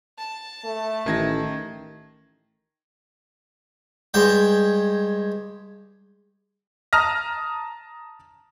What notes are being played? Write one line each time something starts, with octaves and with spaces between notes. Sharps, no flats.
A5
A3
A1 D#3 G#6 A#6
G2 G#3 G5
A5 A#5 D#6 F6 A#6